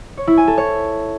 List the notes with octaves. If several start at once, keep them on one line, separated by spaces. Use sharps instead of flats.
C#5
E4
G#5
A4
C#5